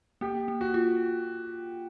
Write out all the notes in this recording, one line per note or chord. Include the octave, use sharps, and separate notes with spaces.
A#3 G4
A#3
F#4
F4